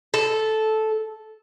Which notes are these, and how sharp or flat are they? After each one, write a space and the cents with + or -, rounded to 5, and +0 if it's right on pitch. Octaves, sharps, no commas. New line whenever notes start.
A4 -10